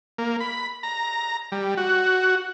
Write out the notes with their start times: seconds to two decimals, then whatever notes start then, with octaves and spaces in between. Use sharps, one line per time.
0.18 A#3
0.40 B5
0.83 A#5
1.52 G3
1.77 F#4